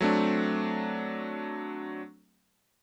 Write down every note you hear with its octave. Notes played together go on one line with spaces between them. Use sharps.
F#3 A3 C4 D4